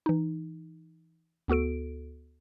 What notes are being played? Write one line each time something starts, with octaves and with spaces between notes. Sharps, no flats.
E3 D#4
D2 B3 F#4 A4 D7